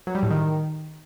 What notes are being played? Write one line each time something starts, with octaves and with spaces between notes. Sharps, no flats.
F#3
G3
A2
D#3